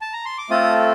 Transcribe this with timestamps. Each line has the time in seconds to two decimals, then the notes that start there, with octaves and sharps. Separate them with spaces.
0.01 A5
0.13 A#5
0.25 C6
0.38 D6
0.50 A3 C4 F4 A4 D#6